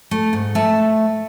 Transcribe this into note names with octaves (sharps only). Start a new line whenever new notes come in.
A3
G#2
A3 A5